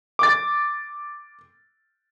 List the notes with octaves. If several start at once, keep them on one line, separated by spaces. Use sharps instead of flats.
D6 A6